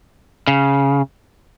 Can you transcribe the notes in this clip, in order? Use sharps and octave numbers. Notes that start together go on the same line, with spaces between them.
C#3